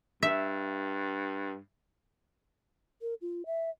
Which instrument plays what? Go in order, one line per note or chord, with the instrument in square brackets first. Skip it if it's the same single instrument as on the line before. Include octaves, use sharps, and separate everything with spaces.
[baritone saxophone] G2 [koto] E5
[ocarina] A#4
F4
E5